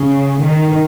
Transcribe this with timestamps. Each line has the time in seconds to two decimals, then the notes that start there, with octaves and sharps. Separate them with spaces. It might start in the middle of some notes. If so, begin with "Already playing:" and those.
Already playing: C#3
0.40 D#3